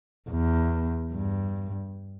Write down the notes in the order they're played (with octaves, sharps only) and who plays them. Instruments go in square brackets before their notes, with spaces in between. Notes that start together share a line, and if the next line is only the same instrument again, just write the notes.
[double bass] E2
G2